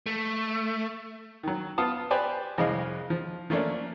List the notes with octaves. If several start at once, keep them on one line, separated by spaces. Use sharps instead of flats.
A3
D#3 F#3
B3 F4 A5 D#6
G4 B4 C5 D5 G#5
C2 F2 G#3 D#5 F5
F3
F3 A3 A#3 C#4 D4